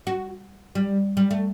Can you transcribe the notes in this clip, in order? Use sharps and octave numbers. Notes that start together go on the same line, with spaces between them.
F#4
G3
G3
A3